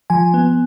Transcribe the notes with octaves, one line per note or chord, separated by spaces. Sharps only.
F3 G#5
B3